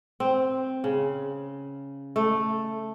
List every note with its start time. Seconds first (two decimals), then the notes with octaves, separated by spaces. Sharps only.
0.20 C4
0.84 C#3
2.16 A3